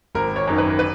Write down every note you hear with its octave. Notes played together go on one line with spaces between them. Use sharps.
G#1 A#4
C#5
F#2 D#3
B4
B4